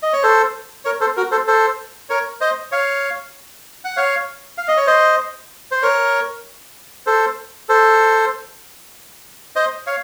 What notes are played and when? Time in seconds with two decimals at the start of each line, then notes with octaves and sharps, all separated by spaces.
0.03 D#5
0.13 C#5
0.23 A4 C5
0.85 A#4 C#5
1.01 A4 C5
1.17 F#4 A#4
1.32 A4 C5
1.47 A4 C5
2.09 A#4 C#5
2.41 C5 D#5
2.72 C#5 F5
3.84 F#5
3.97 C#5 F5
4.58 F5
4.68 D#5
4.77 C#5
4.87 C5 D#5
5.71 C5
5.82 A#4 C#5
7.06 A4 C5
7.69 A4 C5
9.56 C5 D#5
9.87 C#5 F5